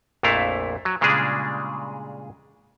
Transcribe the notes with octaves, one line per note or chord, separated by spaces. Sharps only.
A#1 F2 A#2 A3 E4 F5
F#3
A#2 C#3 G3 G#3 D4 G#4